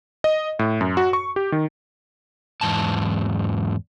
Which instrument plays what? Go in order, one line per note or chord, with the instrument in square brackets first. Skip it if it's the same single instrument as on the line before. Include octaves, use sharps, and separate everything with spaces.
[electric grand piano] D#5
A2
F#2
F#4
C#6
G4
D#3
[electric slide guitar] E2 G#2 A5